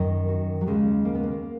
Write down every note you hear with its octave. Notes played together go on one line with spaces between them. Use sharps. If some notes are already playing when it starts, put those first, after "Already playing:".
Already playing: F#2 D#3 A#4
F#4
F#3
D#2 C#3 G#3
A#3
B3
A#3